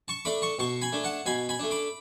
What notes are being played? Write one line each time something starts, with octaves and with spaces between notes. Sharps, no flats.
A5 C#6
A3 D4 B5 D6
A5 C#6
B2 A5 C#6
G#5 B5
A3 D4
F#5 A5
B2 G#5 B5
G#5 B5
A3 D4
B5 D6